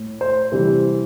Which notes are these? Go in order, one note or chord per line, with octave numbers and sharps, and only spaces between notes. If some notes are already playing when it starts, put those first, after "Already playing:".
Already playing: A2
C5
C3 E3 G3